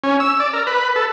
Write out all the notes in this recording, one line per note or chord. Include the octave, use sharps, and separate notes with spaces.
C#4
E6
D5
A#4
B4
A4